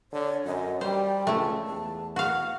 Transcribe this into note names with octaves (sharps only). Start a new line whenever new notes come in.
D3 C#5
F#2 D#5
G3 C5 G5
C#2 A3 E4
E2 A5
F#4 F5 F#5